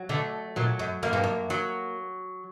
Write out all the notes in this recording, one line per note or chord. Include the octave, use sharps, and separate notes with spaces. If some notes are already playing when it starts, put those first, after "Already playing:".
Already playing: F#3
D3 A3
A#2 F#3
F#2
F#2 A#3
G2
F#2
F#3